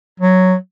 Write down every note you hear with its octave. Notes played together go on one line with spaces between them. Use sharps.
F#3